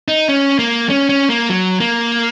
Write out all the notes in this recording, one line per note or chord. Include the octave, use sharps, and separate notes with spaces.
D#4
C#4
A#3
C#4
C#4
A#3
F#3
A#3